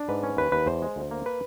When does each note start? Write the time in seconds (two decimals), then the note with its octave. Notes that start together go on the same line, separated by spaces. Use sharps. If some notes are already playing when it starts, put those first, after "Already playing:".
Already playing: D4
0.09 G#2 B4
0.23 C#4
0.37 D#2 B4
0.52 D#2 B4
0.66 E2 C5
0.82 G#3
0.96 D2
1.11 A#3
1.26 B4